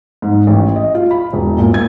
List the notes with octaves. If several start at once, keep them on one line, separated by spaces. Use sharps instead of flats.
G#2
A1
D#5
F4
B5
E1
A#2
G#6